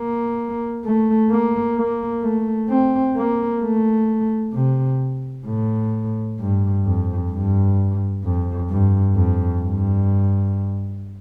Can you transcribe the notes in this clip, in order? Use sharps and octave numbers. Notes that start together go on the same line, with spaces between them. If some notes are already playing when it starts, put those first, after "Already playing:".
Already playing: A#3
A3
A#3
A#3
A3
C4
A#3
A3
C3
A2
G2
F2
G2
F2
G2
F2
G2